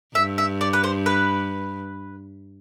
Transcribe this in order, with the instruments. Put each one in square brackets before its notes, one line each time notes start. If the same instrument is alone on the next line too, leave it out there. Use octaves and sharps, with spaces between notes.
[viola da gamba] G2 [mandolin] E5
[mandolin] E5
D5
B4
C5
B4